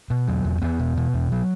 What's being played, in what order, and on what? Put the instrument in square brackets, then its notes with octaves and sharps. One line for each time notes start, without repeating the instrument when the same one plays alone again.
[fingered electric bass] B2
E2 F#3
E2
E2 B3
B2
B2
E2
F#3